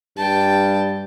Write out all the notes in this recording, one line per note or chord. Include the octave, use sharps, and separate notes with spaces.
G2 G5 A5